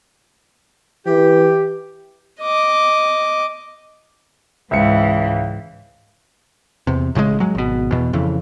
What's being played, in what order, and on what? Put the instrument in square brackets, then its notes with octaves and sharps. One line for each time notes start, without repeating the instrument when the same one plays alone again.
[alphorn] E3 [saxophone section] G4
[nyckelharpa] D#5 D6
[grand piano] C#2 E5 C#7 [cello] G#2 E3
[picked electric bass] E2 C3
A1 C#3 E3 G#3
F#3 G#3
G#1 B2
E2 B2
F2 C#3 E3